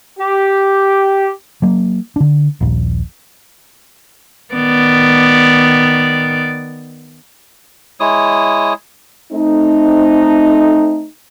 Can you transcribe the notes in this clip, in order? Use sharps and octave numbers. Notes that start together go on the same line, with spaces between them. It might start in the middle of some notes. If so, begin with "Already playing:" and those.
G4
F#3 A#3
D3 D4
D#1 A#1
D#3 B3 D5
G#3 E4 C#5 D#6
A3 C4 D#4